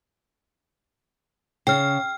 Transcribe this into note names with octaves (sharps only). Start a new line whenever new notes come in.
C#3 G5 F6